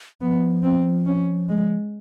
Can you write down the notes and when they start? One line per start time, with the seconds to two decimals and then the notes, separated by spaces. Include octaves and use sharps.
0.21 F3 B3
0.63 C4
1.06 C#4
1.49 G#3